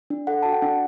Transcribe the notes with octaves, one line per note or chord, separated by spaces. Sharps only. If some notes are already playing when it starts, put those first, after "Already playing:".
D4
A4 F#5
F#4 A5
G5
D4 F#5